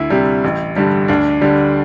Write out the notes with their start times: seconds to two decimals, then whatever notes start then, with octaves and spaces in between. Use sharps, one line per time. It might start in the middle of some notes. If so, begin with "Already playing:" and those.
Already playing: D2 E4
0.10 C3 G3
0.44 A1
0.76 G2 D3 G3
1.08 D2 D4
1.41 D3 G3